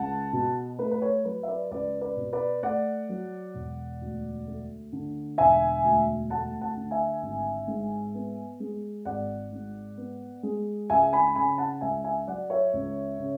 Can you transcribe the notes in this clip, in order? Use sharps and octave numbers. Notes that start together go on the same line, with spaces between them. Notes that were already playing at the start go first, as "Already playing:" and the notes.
Already playing: C#2 F#5 A5
B2
A3 B4
B4
C#5
F#3 B4
E5
B4 D5
C#2 B4 D5
B4 D5
B2
B4 D5
A3 D5 F#5
F#3
E1
D2
A3
D3
E1 E5 G#5
D2
A3 F#5 A5
F#5 A5
D3
E5 G#5
G#1
G#2
B3
G#3
G#1 D5 F#5
G#2
B3
G#3
C#2 E5 G#5
G#5 B5
C#3 G#5 B5
F#5 A5
C#2 E5 G#5
E5 G#5
F#3 D5 F#5
C#5 E5
C#2
C#3